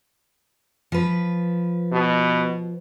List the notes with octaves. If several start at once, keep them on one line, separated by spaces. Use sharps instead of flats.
F3 B4
B2